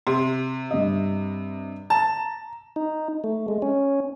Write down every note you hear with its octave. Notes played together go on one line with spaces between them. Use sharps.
C3 C6
G2 D#5
A5 A#5
D#4
A3
G#3
C#4